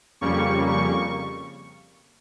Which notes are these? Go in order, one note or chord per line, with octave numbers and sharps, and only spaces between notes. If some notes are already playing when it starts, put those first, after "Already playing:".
F2 C#3 G3 A#3 C#6
C#6